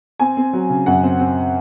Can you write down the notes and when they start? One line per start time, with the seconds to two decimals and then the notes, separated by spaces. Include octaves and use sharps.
0.20 C4 G#5
0.37 C4
0.53 F#3
0.69 C#3
0.86 F#2 F#5
1.03 C4
1.20 C4